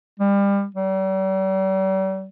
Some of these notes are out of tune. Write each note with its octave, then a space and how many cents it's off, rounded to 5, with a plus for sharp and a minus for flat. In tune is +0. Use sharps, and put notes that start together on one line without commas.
G3 +30
G3 -45